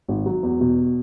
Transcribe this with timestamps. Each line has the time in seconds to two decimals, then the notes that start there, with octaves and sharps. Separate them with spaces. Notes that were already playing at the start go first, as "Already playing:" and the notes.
0.08 G#1
0.26 F#3
0.43 E2
0.60 B2